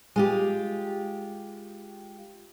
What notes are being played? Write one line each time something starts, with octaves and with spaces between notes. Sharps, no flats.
G#3 F4 G4